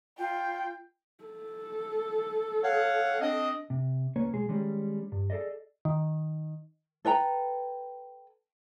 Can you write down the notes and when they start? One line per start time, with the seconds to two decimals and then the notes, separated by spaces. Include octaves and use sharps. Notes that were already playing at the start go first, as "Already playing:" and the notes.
0.19 F4 G5
1.24 A4
2.63 C#5 F5 F#5
3.21 C4 D4 D#5
3.70 C3
4.16 C#2 A#3 B3 C#4 C#5
4.33 B1 G#3 G#4
4.49 D#3 G3 G#3 C#4
5.12 G2
5.30 G#4 A4 B4 D5 D#5
5.85 D#3
7.05 A4 B4 G5 A#5